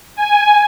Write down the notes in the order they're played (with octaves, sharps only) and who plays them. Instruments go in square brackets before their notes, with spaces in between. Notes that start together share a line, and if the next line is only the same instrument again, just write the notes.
[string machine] G#5